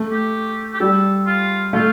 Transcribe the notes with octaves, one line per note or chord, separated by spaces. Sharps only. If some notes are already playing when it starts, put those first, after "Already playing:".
Already playing: A3
G4
G4
G3 A4
F4
A3 F4